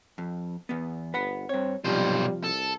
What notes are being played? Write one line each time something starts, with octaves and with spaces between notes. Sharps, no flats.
F2
E2 B3
G1 B4 F#5 B5
G2 C4 C#5
B1 C3 F3 G3 C5
C2 A4